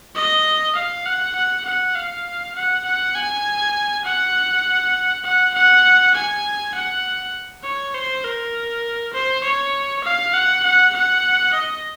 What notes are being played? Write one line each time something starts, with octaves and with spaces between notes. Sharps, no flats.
D#5
F5
F#5
F#5
F#5
F5
F#5
F#5
G#5
F#5
F#5
F#5
G#5
F#5
C#5
C5
A#4
C5
C#5
F5
F#5
F#5
F#5
D#5